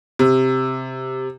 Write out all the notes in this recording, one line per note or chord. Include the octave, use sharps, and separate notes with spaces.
C3